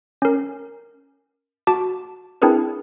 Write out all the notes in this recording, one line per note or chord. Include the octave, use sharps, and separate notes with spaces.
C#4 A#4
F#4 A5 D6
C4 D4 E4 G#4 A#4 B4